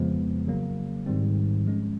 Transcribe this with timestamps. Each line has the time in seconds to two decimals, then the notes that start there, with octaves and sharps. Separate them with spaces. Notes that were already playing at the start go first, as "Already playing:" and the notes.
Already playing: F2 C#3 F3 G#3 B3
0.47 C#3 F#3 A#3
1.06 G#2 D#3 G3 C4
1.65 F3 G#3 C#4